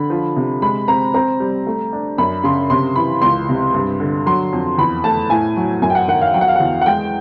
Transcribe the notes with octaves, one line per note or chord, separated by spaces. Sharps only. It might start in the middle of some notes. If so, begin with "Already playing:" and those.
Already playing: D3 B5
F3
C3
G#3 B5
C4 A#5
C4 A#5
G3
A3
D4
F#2 B5
C#3 C6
C3 C6
E3 B5
C#2 C6
C3
G2
D3
F#3 C6
F2
E2 B5
A3 A5
A2 G#5
F#3
F#2 G#5
G5
F#5
D#3 F#5
F5
F#3 G5
F#5
F5
E2 F#5
F#5
G#3 G5